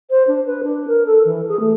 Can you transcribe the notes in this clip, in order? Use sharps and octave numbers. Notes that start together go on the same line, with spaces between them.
C5
D4
B4
D4
A#4
A4
E3
G#4
A3